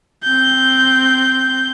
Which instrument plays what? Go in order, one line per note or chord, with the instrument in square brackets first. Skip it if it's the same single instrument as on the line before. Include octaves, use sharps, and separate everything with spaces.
[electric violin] C4 G6